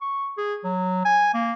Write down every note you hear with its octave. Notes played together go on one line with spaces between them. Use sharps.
C#6
G#4
F#3
G#5
A#3